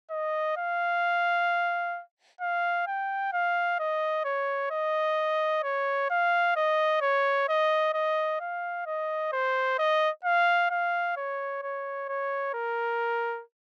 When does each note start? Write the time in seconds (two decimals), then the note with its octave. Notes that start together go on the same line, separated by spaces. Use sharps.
0.11 D#5
0.57 F5
2.41 F5
2.87 G5
3.33 F5
3.79 D#5
4.25 C#5
4.71 D#5
5.64 C#5
6.10 F5
6.56 D#5
7.01 C#5
7.49 D#5
7.94 D#5
8.40 F5
8.86 D#5
9.32 C5
9.79 D#5
10.25 F5
10.71 F5
11.17 C#5
11.63 C#5
12.09 C#5
12.54 A#4